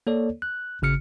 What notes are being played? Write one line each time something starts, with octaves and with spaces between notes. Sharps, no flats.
A#3 A4 C#5 D5
F#6
G#1 C#3 F6 C#7